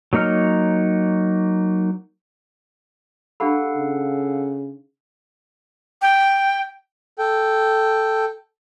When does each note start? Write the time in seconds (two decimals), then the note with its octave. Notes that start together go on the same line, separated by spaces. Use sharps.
0.13 F#3 A#3 D#4 C#5 F6
3.40 D4 G4 A4 F5 F#5 B5
3.77 C#3
6.02 G5
7.18 A4 G5